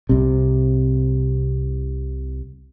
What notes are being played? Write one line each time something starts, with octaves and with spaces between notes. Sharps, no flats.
C2 C3